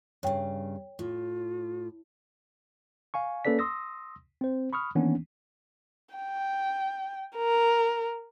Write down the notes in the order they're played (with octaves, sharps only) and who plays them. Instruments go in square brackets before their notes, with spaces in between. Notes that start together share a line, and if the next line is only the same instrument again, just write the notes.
[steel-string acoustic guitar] G2 C#3 [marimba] C#5 G5
[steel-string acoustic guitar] A2 [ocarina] F4
[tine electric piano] F5 G#5 C#6
A#3 C#4 A4 B4 D5 B6
C6 D#6 E6 A#6
C4 C5
B5 C#6 D#6 F6
D#3 E3 A#3 B3 C#4 D4
[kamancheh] G5
A#4